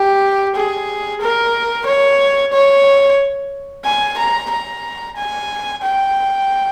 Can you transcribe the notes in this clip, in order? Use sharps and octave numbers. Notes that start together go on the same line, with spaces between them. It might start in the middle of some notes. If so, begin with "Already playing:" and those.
Already playing: G4
G#4
A#4
C#5
C#5
G#5
A#5
A#5
G#5
G5